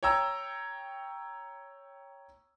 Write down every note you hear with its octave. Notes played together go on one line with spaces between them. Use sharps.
C#5 G5 A#5 E6